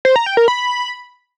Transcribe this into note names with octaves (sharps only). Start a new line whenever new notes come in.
C5
A#5
G5
A#4
B5